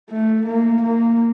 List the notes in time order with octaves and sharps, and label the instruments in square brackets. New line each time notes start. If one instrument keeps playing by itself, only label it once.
[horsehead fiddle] A3
A#3
A#3